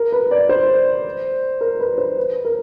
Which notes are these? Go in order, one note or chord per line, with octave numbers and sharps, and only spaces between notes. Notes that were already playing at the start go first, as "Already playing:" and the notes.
Already playing: A#4
B4
D5
C5
A#4
B4
C5
B4
A#4